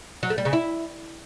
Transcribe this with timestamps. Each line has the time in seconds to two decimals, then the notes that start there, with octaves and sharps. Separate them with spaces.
0.23 F#3
0.30 A3
0.38 G3
0.45 C#3
0.53 E4